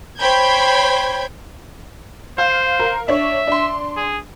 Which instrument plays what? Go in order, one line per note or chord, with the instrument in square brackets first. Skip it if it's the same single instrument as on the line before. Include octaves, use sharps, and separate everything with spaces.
[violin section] C5 C#5 G5 B5 G6 G#6
[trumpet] C5 [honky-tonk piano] F5
[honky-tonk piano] A#4 F5
[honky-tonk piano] D4 C#5 [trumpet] E5
[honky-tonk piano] D4 C6
[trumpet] G#4